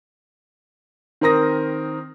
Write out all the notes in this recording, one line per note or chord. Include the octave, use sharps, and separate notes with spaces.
D#3 C4 A#4 D#6 A#6